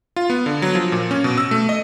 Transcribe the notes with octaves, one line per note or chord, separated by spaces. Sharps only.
F4
B3
D3
F#3
F3
A#2
C#4
B2
E6
A3
D#5